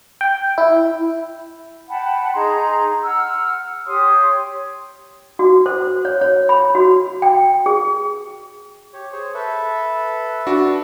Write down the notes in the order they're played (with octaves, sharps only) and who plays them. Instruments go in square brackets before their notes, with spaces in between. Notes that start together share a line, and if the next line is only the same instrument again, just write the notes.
[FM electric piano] G5
E4
[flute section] F#5 G5 A5 B5
D#4 G#4 A#5 C6
F#5 E6 F6
G4 C#5 C6 D#6
[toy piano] F#4
C5
C#5
C#5
B5
F#4
G5
G#4
[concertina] G4 C#5
G#4 C5 C#5
A4 B4 E5
[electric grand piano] D4 F#4